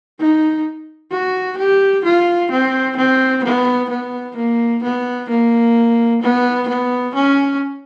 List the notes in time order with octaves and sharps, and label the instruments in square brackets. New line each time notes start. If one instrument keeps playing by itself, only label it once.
[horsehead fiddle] D#4
F#4
G4
F4
C4
C4
B3
B3
A#3
B3
A#3
B3
B3
C#4